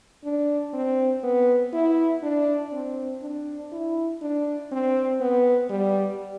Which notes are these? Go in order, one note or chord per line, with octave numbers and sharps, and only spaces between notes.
D4
C4
B3
E4
D4
C4
D4
E4
D4
C4
B3
G3